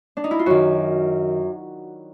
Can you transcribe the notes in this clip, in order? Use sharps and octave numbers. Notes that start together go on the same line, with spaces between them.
D4
D#4
E4
F4
F#2 D#3 F#4